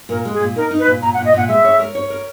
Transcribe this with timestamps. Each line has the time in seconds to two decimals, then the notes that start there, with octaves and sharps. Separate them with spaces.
0.09 A#2 A#4
0.25 G#3
0.33 G#4
0.40 A#2
0.55 D#4 A#4
0.71 D#4
0.79 B4
0.87 A#2
1.02 A#2 A#5
1.14 F#5
1.18 A#2
1.25 D#5
1.34 A#2 F#5
1.48 G#3 E5
1.64 C#5
1.79 A#4
1.95 C#5
2.10 A#4